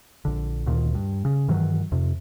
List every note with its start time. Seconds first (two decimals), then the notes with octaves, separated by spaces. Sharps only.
0.25 A#1 D3
0.66 D2 A#2 D#3
0.94 G2
1.25 C#3
1.48 G2 D#3 E3 F#3
1.92 F2 C3